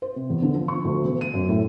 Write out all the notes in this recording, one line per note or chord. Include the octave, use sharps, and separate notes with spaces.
C5
C3
E2
D3
F3
C#6
D2
E1
D#7
F#2
A2